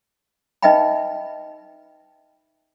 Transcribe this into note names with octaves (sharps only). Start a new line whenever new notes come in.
D#4 B4 D#5 E5 G5 B5